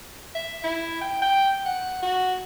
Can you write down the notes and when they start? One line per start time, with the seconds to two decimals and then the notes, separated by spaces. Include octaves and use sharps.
0.35 E5
0.64 E4
1.02 G5
1.22 G5
1.65 F#5
2.02 F#4